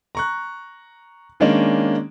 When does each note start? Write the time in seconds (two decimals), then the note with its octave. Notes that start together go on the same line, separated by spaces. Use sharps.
0.15 A#5 C#6 F#6
1.40 D#3 G#3 A#3 C#4 D4